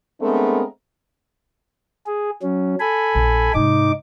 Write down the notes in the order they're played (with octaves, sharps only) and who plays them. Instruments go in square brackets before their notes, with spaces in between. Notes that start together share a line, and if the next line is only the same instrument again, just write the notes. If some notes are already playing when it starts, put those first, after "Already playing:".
[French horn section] G#3 A3 B3 C4 D4 A#4
[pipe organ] G#4
F#3 C#4
A4 G#5 B5
[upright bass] A#1
[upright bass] G#2 C3 [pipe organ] D#4 D6